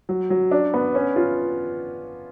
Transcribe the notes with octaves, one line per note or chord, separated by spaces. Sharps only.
F#3
F#3
D4
B3
C#4
F4